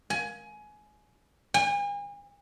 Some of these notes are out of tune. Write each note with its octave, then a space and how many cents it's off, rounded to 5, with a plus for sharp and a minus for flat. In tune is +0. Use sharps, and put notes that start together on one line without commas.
G#5 +20
G#5 -40